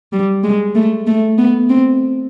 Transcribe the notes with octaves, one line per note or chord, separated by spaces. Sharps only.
G3
G#3
A3
A3
B3
C4